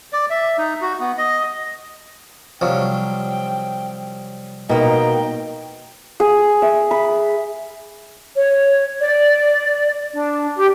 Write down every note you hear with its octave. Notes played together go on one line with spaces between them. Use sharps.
D5
E5
D#4
F#4
B3
D#5
C2 F3 F#3 G5
B2 A#3 D#4 G5
G#4
E5
B5
C#5
D5
D4
G4